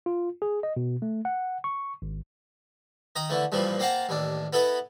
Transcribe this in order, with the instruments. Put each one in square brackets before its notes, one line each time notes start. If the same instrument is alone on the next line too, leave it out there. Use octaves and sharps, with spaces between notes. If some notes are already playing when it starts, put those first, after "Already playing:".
[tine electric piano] F4
G#4
D#5
B2
A3
F#5
C#6
G#1
[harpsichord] D#3 A#5 D#6
D3 E3 A3
G2 A#2 E3 F3 G3
A#3 C4 F5 F#5 A5 A#5
A1 D#2 D4
B3 E4 A4 B4 D#5